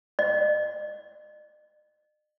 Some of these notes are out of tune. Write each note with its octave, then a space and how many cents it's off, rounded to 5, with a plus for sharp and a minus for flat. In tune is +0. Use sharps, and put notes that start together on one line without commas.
D#5 -45